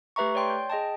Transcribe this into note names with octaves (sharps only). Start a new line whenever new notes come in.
A3 G4 B4 E5 A#5 C#6
C#5 D5 G5 C6
G6
G#4 D#5 G5 A5